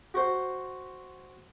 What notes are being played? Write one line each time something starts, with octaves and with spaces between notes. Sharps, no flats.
F#4 C5